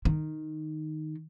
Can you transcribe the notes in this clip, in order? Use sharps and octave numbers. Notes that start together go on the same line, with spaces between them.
D#3